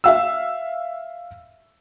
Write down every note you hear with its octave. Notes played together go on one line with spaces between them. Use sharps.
E5 F5 E6